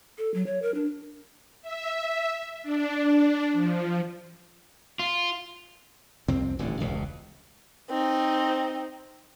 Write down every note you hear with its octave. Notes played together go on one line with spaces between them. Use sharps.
A4
F#3
C#5
A#4
D4
E5
D4
F3
F4
C2 F2 C3 C4
D#1 A1 A2 D3
E1 C#2 B2
C4 D#4